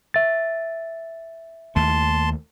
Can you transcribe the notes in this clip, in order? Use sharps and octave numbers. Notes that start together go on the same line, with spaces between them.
E5 A6
D#2 A3 A5 C6